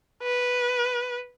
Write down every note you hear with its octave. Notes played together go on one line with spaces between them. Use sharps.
B4